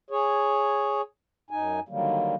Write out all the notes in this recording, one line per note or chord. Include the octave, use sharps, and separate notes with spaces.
G#4 C#5
F#2 D#4 G#5
D3 D#3 F#3 G3 A#3